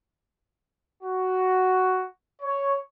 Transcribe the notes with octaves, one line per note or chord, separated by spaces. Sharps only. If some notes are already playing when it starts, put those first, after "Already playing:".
F#4
C#5